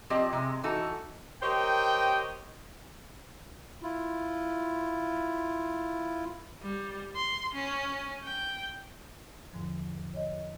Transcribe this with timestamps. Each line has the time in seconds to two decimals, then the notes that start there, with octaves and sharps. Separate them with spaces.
0.10 F3 C4 G4 D5 D#5 A5
0.33 C3 G#3
0.64 E3 D#4 F#4 A4
1.42 G4 A#4 C5 C#5 D#5 G5
3.83 E4 F4
6.62 G3
7.15 C6
7.54 C#4
8.23 G5
9.53 E2 G#2 D3 F3
10.14 C#5 D#5